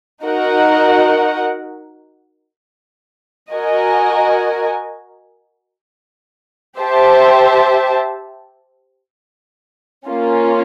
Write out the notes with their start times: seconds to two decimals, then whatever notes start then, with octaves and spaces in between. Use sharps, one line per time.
0.24 D#4 F#4 A#4 D#5 F#5
3.52 F#4 A#4 D#5 G#5
6.79 G4 C5 E5 A5
10.07 A#3 C#4 F4